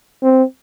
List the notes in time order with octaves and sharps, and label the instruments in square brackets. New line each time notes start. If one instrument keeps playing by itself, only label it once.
[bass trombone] C4